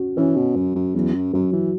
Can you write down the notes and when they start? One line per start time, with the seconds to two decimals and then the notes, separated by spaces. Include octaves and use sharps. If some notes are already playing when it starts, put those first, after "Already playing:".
Already playing: C#4 F#4
0.17 E3 C#4
0.36 B2
0.55 F#2 C#4
0.75 F#2
0.95 E2 F#3
1.15 F#2
1.33 F#2 F#3
1.53 E3